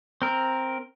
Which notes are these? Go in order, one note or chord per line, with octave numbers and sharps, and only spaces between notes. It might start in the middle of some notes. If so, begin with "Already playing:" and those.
C4 A#4